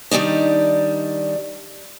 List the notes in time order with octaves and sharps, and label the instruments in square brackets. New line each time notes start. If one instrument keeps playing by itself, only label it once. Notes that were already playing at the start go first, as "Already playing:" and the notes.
[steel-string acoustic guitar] D#3 G3 A3 D4 D#4